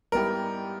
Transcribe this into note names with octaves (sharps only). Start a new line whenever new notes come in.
G#2 G3 B3 E4 G4 A#4